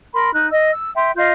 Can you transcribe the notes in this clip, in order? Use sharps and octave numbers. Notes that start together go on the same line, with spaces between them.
A#4 B5 C6
D#4 F#6
D#5 E6
E6
E5 G5 C6
F4 D#5 F5 G6